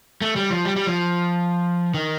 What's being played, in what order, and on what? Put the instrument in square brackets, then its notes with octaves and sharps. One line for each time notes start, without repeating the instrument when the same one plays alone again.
[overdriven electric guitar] A3
G3
F3
G3
G3
F3
D#3